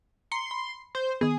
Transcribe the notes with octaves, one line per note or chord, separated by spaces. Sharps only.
A#5 C6 C#7
B5
C5
D#3 B3 G#4